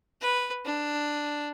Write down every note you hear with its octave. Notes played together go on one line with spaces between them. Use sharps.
B4
D4